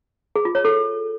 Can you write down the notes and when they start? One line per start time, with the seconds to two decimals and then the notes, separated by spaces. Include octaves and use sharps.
0.36 G#4
0.45 F4
0.55 C#5
0.65 A4